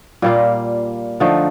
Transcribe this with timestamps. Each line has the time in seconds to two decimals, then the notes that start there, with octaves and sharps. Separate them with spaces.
0.22 A#2 G3 A#3 F4
1.20 D3 F3 A3 D#4